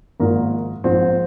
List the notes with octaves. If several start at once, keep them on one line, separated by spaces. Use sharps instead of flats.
G#1 G#2 F3 A#3 A#4
A#1 G#2 F3 C4 C5